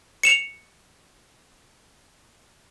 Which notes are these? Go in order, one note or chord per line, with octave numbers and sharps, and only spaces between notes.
C#7 E7 F7